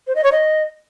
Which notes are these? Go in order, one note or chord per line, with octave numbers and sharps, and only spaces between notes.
C5
D#5
C#5
D#5